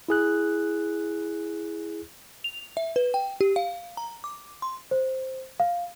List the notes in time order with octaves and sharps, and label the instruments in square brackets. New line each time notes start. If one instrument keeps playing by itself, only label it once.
[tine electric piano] E4 G#4 F#6
[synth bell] F7
E5
B4
G5
G4
F5
A#5
D6
C6
[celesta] C5
F5